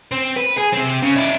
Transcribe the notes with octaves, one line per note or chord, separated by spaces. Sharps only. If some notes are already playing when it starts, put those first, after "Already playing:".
C4
B4
G#4
C3 C4
C#3
D4 E4